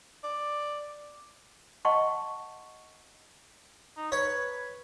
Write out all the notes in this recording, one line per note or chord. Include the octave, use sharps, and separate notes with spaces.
D5
D#5 F#5 G5 A5 C6 C#6
D#4
B4 C#5